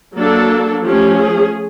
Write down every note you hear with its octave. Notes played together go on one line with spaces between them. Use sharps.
F#3 A#3 D4 A4
F3 A3 C#4 G4
G#4